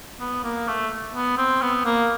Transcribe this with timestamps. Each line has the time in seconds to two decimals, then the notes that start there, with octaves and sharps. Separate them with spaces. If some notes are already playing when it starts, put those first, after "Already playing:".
0.20 B3
0.43 A#3
0.68 A3
1.15 B3
1.38 C4
1.62 B3
1.86 A#3